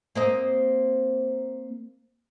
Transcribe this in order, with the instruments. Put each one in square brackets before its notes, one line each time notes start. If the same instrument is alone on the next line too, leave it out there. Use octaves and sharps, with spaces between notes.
[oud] A#3 C4 D#5